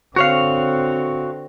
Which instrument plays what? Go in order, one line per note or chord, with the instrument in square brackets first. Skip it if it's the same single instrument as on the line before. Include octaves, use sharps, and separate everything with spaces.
[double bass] D3 C4 [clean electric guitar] F#4 C#5 F5